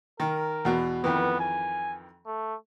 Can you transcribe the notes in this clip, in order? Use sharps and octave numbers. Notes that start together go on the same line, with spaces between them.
D#3 A#4
E2 B2
F2 D#3 E3 B3
G#5
A3